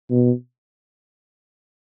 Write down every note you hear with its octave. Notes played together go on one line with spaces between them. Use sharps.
B2